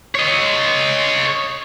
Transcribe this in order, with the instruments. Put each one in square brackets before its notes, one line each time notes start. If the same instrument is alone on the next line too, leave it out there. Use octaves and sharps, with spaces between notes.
[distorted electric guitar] C#5 D#5